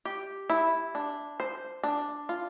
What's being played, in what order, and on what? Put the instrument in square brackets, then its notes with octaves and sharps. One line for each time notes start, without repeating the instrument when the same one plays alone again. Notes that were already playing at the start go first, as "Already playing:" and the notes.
[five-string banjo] G4
E4
D4
C5
D4
F4